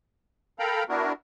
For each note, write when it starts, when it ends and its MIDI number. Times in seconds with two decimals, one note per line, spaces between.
0.59 0.84 69
0.59 0.84 70
0.59 0.84 77
0.59 0.84 79
0.59 0.84 82
0.59 0.84 83
0.89 1.12 59
0.89 1.12 62
0.89 1.12 64
0.89 1.12 66
0.89 1.12 70